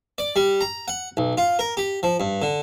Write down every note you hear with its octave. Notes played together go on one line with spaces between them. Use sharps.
D5
G3
A#5
F#5
B1
F4
A#4
G4
F3
G2
D3